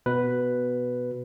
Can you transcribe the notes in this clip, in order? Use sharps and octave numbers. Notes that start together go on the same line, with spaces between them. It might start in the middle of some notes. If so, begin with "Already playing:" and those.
B2 B4